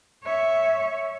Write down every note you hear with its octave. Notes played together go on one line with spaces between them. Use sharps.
C#5 E5